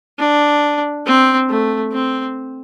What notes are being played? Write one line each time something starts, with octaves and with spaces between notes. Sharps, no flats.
D4
C4
A3
C4